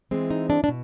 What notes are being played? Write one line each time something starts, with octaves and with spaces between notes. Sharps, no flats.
E3 G#3 C4
D#4
D4
D4
B2